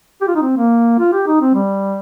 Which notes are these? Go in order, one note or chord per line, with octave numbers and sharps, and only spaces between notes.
G4
F4
D#4
C4
A#3
F4
G4
D#4
C4
G3